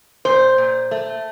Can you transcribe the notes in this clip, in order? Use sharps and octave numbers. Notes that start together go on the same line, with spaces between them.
A#2 C5
A#2
A3